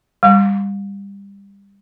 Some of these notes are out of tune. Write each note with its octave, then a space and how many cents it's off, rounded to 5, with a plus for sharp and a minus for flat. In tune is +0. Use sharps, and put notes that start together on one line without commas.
G3 +25